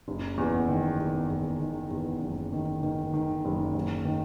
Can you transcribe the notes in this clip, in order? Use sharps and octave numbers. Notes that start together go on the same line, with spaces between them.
F#1
E2
D#3
E2
E2
D#3
E2
F#1
D#3
D#3
D#3
F#1
F#1
D#3